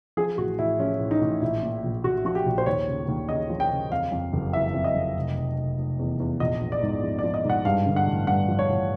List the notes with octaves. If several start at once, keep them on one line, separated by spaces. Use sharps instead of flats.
F3 G#4
A1 F#4
A1 E4
F3 C#4
A1
D#4
A1
A#1 E4
A#2
A#1
A#1 F#4
F3 F#4
G4
A#1
C5
D#2 C#5
C#3
D#2
C#3 D#5
F3
G5
C#3
F2 F5
F2
F#1
E3 E5
F2
D#5
F2
F1
F1
F1
F1
E2
E2
A#1 D#5
A#1
D5
G#2
F3
D5
F3
D#5
G#2
F#5
G2 F5
D3
F#5
A1
G2 F#5
F3
C#5
A1